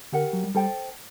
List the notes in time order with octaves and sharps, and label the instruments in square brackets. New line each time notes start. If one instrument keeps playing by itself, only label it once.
[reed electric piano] D3 [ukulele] G4 A#4 F#5
[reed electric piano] F#3
G3
[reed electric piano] G3 [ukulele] A4 C5 G5